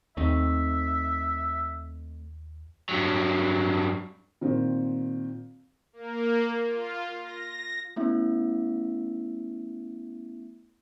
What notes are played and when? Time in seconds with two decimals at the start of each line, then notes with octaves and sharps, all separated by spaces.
0.17 D#2 A3 C4 D#4 E5
2.89 G2 F#3
4.41 A#2 D#3 C4
5.93 A#3
6.66 F4
7.22 A#6
7.96 A3 B3 C#4 E4 E5